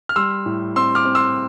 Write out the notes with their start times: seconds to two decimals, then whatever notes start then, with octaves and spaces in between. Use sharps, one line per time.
0.09 F6
0.16 G3 C6 E6
0.46 A2
0.76 C4 C6 E6
0.95 D6 F6
1.05 C4
1.15 C6 E6